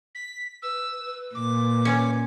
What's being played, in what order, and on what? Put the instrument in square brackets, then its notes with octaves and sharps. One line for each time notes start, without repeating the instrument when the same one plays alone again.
[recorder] B6
[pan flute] B4 [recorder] E6
[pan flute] B4
[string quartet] A#2 [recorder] D6
[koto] C#4